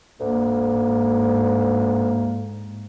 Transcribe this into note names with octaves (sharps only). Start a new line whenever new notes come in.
D2 G#2 A#3